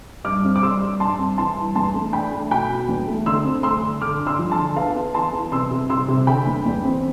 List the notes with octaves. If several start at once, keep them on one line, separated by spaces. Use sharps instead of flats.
G2 D6 F6
C4
D6
G3 C6 E6
G2
G2 A5 C6
C4
E3 A5 C6
G2
E2 A5 C6
A3
D4 G5 B5
A3
B2 G5 B5
B2
E2
A3
D3 C6 E6
C4
A3 C6 E6
D3
D3 D6 F6
D3
C6 E6
F3
A5 C6
D3
B3 F5 A5
B3
E3 A5 C6
B3
C3 C6 E6
C3
C3 C6 E6
C3
D3 G5 B5
E2
E2
C4